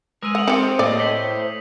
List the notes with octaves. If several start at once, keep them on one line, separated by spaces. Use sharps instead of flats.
G#3 A#4 D#6 E6 D#7
F#5 D#6 F7 F#7
D#3 C4 G4 A4 C#7
A2 A#3 G4 D5 D#5
C5 B6 F#7